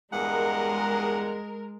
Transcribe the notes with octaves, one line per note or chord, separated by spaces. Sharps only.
E2 G2 G#3 A#4 F#5